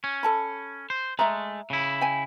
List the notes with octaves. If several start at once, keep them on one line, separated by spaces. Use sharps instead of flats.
C#4
A4 A5 B5
C5
G#3 A3 E5 A#5
C#3 E4
G5 G#5